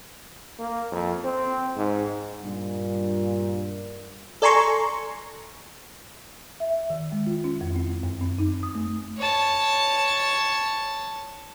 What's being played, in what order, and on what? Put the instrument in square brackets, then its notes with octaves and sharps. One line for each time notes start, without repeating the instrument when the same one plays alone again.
[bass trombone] A#3
F2
C4
G#2
[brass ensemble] G2 A#2
[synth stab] A4 D5 G#5 A#5 C6 C#6
[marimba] E5
D#3
G#3
F4
C#4
F2
C4
F#2
C4
D#4
D#6
A3
[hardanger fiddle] C#5 A5